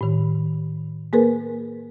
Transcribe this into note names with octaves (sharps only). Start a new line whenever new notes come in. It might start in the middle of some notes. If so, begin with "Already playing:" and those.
A2 D#3
A#3 G#4 A#4 B4